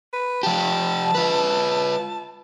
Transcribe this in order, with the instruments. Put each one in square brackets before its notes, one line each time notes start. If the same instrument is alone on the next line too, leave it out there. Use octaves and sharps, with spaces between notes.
[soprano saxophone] B4
[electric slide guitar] F3 G4 [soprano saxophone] A5
[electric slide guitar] F4 B4